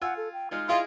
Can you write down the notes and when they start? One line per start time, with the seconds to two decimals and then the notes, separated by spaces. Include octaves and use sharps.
0.02 F4 F#5 G#5 E6
0.17 A4
0.33 G5
0.51 G#3 D#4 F4 F6
0.69 E4 F4 G#4 D#5